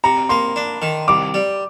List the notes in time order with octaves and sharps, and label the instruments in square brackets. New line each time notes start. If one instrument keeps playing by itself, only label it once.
[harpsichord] C3 [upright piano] A#5
[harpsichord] A#3 [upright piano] C6
[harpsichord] D4
D#3
[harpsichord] C2 [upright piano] D6
[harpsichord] G3